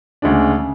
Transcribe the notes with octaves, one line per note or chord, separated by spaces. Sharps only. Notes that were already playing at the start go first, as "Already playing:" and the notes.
D2 C#3 G#3 D4
C#3